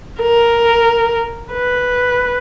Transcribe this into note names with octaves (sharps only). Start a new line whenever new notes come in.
A#4
B4